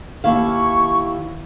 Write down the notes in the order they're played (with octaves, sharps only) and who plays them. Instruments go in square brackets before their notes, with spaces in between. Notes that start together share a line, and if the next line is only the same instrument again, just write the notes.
[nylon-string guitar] D#2 E4 F5 [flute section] C#6